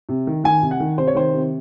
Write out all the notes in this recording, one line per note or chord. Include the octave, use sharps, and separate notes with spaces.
C3
D#3
D#3 G#5
C3
F#5
D#3
C3 C5
C#5
D#3 C5
C3